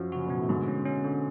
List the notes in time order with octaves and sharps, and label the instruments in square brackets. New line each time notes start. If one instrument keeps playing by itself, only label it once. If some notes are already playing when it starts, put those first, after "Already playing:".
Already playing: [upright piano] F#2 [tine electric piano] F3 F4 F#4
[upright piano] C#3 [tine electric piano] F#4
[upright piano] B2 [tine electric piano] B3
[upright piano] A2
[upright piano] G#2 [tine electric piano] D3
[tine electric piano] C#4
C#4
D3